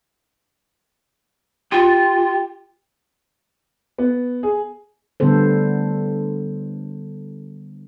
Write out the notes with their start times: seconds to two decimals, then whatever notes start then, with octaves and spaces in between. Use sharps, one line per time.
1.72 F4 G4
3.98 B3
4.43 G#4
5.20 D3 G3 B3 A4 C5